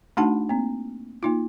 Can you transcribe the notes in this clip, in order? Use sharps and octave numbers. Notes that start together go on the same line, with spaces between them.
A3 D4 D#4 F#4 F#5 A5
A#3 C4
A#3 D#4 F4